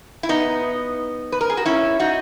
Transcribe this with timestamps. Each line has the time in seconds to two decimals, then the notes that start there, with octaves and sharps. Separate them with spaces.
0.23 E4
0.29 B3 D#4
1.32 B4
1.41 A#4
1.50 G#4
1.57 F#4
1.65 C#4 E4
2.00 D#4 F#4